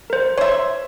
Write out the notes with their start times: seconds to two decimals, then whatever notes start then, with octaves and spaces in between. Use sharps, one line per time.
0.10 A#4 C5
0.38 C5 C#5 E5